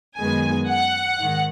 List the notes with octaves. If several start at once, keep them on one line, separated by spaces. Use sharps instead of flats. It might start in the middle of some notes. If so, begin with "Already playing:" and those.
F#2 D#3 G#3 B3 G#5
F#5
G#2 D#3